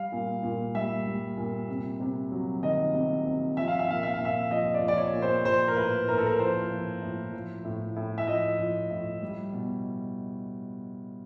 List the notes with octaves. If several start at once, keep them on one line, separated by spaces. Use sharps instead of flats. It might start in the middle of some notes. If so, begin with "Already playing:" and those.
Already playing: G3 F5
A#2
A#2
G3 E5
G3
A#2
C3
C3
F#3
D#3 D#5
C3
C3
F3 E5
F5
E5
A#2 F5
E5
F5
A#2
E5
F3 D#5
D5
F3
D5
C#5
A#2
C5
F3 C5
A#4
A2 B4
A2 A#4
A4
A#4
F3 C5
F3
A2
F3
A2
A2
E5
F3 D#5
F3
A2
G3
B2